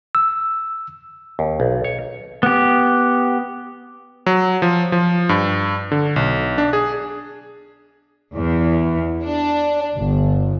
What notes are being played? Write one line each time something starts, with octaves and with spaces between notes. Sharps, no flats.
E6
D#2
B1
C#5
B3 G4
F#3
F3
F3
G2
D3
B1
D4
G#4
E2
D4
G1